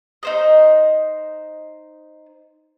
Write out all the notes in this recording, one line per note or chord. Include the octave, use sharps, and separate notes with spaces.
D#4 C5 D#5